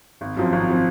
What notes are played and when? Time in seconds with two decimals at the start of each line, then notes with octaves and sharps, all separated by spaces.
0.21 G#1
0.37 F#2 F3 C4
0.52 G#1
0.70 F3 C4